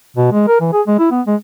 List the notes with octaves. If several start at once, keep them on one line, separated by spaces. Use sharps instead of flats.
B2
G#3
A#4
E3
G#4
G#3
E4
B3
G#3